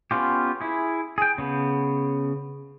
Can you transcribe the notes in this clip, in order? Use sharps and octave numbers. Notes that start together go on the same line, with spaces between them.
B3 C#4 F4 G4
E4 G#4
G#4 G5
C#3 B3